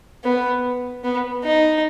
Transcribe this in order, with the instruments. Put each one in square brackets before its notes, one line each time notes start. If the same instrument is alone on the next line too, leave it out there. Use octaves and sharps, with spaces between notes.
[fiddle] B3
B3
D#4